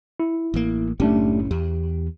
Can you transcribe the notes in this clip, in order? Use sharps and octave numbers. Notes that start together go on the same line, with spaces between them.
E4
A1 A#3
F#1 A2 A3 C#4 D4 G4
E2 G4